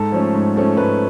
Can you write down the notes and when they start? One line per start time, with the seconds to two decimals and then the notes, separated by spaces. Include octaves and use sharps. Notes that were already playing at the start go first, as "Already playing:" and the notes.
Already playing: G#2 A4
0.12 F3 A3 C#4
0.34 G#2
0.56 F3 A3 C#4
0.77 G#2 B4